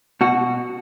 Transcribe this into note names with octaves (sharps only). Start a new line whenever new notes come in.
B2 F#4